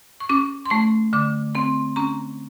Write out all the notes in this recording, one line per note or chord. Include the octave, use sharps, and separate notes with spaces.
C#6
C#4 D6
C6
A3 C#6
D3 D6
C4 C6
C#4 A#5